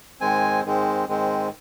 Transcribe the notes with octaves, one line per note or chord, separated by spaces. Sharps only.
G#2 D#3 G#3 C4 G#5
G#2 D#3 G#3 C4
G#2 D#3 G#3 C4